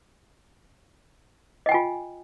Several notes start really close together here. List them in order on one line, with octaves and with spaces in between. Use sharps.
D#5 G5 G#5 F4